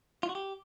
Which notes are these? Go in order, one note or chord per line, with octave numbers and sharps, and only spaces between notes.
F4
F#4
G4